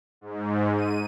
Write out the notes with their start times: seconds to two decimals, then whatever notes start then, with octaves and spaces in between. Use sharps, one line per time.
0.21 G#2
0.76 D#7